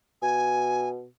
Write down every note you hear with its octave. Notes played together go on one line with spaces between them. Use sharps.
B2 G#5